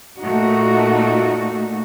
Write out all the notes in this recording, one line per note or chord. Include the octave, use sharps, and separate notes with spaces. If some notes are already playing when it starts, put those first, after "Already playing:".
A#2 A3 D#4 F#4